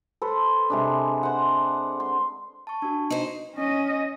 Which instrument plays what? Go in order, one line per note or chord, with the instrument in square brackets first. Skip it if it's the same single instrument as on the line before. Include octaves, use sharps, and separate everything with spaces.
[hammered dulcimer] A4 B4 C5
C3 G#3 D4
C5 F#5
C6
[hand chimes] A5 C#6
D4 F#4
[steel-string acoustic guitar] D#4 C5
[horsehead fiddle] C#4 D#5